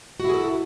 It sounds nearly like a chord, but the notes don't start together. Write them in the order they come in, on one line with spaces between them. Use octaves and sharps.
F#4 E4 G#4 A4